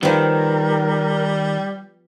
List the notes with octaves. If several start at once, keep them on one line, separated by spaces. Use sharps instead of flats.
D#3 F3 G3 B3 A#4